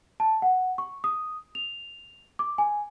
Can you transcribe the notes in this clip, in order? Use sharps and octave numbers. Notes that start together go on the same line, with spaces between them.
A5
F#5
C#6
D#6
F7
D6
G#5